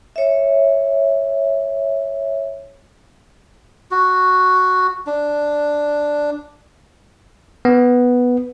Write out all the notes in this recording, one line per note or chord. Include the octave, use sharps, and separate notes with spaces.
C#5 E5
F#4
D4
B3